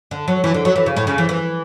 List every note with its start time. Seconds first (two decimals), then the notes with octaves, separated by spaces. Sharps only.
0.11 D3
0.28 F#3
0.44 E3
0.54 D3
0.65 F#3
0.76 E3
0.86 C#3
0.97 A2
1.07 C#3
1.18 E3
1.29 E3